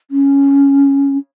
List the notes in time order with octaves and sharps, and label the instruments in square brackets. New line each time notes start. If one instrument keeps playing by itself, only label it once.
[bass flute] C#4